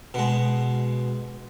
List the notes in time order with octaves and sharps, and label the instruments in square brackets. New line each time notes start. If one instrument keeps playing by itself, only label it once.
[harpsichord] B2 G#3